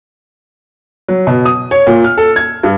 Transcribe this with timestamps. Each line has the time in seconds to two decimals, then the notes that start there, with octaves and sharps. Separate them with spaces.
1.09 F#3
1.27 B2
1.45 D#6
1.71 C#5
1.87 A#2
2.04 F6
2.17 A4
2.36 G#6
2.63 G2